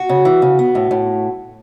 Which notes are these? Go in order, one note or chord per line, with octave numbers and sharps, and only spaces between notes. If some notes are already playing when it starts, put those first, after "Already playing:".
Already playing: F#4
C#3
E3
C#3
B3
A2
A2